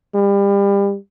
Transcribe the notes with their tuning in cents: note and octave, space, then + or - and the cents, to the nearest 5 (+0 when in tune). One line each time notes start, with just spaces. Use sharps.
G3 +30